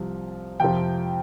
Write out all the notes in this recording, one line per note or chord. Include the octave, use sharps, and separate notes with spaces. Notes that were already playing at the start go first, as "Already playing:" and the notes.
Already playing: C2 C3 F3
F2 C3 F3 G5